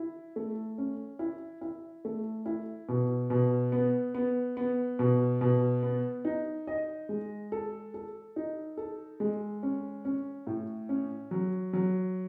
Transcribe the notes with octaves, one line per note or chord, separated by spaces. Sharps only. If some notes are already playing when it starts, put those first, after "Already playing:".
Already playing: E4
A3
C#4
E4
E4
A3
E4
B2
B2
B3
B3
B3
B2
B2
B3
D#4
D#5
G#3
A4
A4
D#4
A4
G#3
C#4
C#4
A2
C#4
F#3
F#3